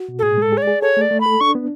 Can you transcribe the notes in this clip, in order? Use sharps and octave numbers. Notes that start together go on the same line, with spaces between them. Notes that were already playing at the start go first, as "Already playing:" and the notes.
Already playing: F#4
B2
A4
A2 G#4
G#3 A4
G#4 C#5
D5
G#4
A4 C#5
A3 D5
A3
B5
A4
D4 C#6
B3